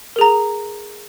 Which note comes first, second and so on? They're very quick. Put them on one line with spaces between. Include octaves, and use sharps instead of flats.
A#4 G#4 A#5